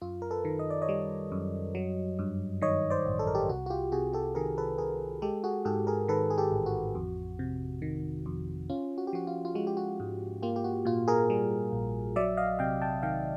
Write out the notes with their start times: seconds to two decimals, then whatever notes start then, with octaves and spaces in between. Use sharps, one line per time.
0.01 F#2 F4
0.22 A#4
0.31 A4 B4
0.45 D#3
0.59 D#5
0.70 D5
0.82 C#5 D#5
0.89 G3
1.32 F#2
1.75 F#3
2.19 G2
2.62 D#3 C#5 D#5
2.90 C5 D5
3.06 A1
3.19 A4
3.27 A#4
3.35 G4 A4
3.49 C2 F#4
3.66 F#4
3.70 F4 G4
3.92 C3 F#4 G#4
4.13 G4 A4
4.35 D#3 G#4 A#4
4.58 A4 B4
4.78 C2 G#4 A#4
5.22 G#3 G4 A4
5.44 F#4 G#4
5.65 G#2 G4 A4
5.87 G#4 A#4
6.08 D#3 A4 B4
6.30 G#4
6.38 G4 A4
6.52 A1
6.66 F#4
6.95 F2
7.39 C3
7.82 D#3
8.26 F2
8.70 C#4 F4
8.98 F#4
9.07 G4
9.13 F3 F#4
9.27 F4
9.45 F4
9.55 G#3 F#4
9.67 G4
9.77 F#4
10.00 G#2
10.42 A#3 F4 G4
10.56 G4
10.64 F#4
10.85 A#2 F4
11.08 G#4 A#4
11.30 G3
11.72 A#1
12.16 F#3 D5 E5
12.37 D#5 F5
12.59 C3 F5 G5
12.81 G5 A5
13.03 D#3 F5 G5